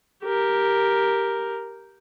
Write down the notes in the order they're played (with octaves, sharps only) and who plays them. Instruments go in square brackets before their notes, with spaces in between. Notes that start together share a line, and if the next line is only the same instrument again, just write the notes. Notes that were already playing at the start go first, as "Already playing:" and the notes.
[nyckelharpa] G4 A#4